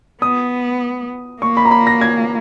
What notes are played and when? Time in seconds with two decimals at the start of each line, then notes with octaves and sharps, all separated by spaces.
0.22 B3 D#6
1.42 A#3 C#6
1.57 B5
1.65 A#5
1.71 B5
1.87 A#6
2.01 G#6